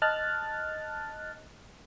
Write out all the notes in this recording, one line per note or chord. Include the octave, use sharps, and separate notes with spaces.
D#5 A5 F6 F#6 A6